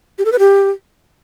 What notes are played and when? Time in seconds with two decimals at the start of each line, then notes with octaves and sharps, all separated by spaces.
0.18 G4
0.25 A4
0.32 B4
0.39 G4